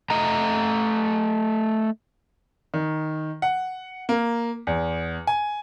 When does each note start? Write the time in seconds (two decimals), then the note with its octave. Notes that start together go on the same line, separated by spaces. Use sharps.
0.10 A3 D#5 A#5
2.74 D#3
3.42 F#5
4.09 A#3
4.67 E2
5.27 G#5